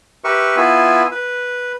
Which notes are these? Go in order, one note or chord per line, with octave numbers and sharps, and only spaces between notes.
G4 A#4 B4 E5 C#6
B3 E4 F4 E5 G#5
B4